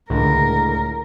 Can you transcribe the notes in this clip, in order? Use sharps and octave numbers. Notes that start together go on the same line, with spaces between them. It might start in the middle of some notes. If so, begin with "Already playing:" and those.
C#2 A2 D3 A#4